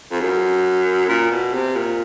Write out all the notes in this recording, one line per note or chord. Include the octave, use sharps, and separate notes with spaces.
F2
F#2
A#2
B2
C3
A#2